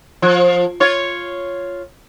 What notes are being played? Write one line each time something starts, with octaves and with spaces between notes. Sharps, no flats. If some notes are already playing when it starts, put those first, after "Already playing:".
F3
F4 C#5